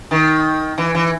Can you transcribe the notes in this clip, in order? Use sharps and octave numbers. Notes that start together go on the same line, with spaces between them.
D#3
E3
E3